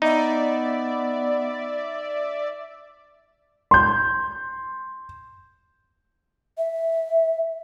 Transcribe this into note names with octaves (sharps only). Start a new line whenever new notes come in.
B3 D#4 D5 E5
C6 G6
E5